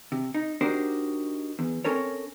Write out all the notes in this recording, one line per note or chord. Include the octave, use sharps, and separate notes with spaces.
C3
D#4
D4 D#4 F#4 G4 A#4 C5
E2
C4 C#4 A4 A#4 C#5